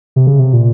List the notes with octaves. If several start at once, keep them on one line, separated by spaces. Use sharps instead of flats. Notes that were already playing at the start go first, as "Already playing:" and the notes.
C3
C#3
C3
A#2